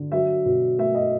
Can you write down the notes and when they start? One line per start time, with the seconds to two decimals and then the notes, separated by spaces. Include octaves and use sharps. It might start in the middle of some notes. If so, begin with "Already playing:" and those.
Already playing: D3
0.12 F#3 E5
0.45 B2
0.78 A3 E5
0.95 D#5